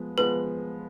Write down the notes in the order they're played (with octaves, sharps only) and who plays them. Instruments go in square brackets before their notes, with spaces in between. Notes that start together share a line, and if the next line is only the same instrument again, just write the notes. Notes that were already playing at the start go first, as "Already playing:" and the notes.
Already playing: [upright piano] F3 G#3 B3
[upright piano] F3 G#3 B3 [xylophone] B4